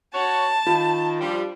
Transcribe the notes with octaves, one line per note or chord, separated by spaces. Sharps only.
F#4 C#5 A5
D#3 F4
F3 G3 D4